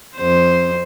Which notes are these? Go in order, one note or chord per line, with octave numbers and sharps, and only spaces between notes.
F2 C5